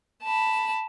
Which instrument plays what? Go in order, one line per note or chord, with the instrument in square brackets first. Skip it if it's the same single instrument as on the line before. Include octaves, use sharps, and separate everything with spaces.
[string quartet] A5 B5